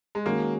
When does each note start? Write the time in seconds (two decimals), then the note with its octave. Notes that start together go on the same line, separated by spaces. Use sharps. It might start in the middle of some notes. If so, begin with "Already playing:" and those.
0.15 G#3
0.26 D#3 G#3 A#3 C#4 F#4